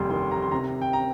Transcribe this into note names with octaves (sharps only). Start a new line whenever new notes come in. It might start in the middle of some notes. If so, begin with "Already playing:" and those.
Already playing: F1 D#2 G3 C6
D#3 C6
A#5
C6
C3 A#5
G5
A#5